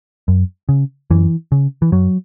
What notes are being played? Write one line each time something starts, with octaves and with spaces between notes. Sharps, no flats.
F#2
C#3
F#2 E3
C#3
E3
F#2 F#3